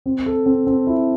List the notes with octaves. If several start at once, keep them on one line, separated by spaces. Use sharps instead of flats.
C4
A4
C4
C4
E4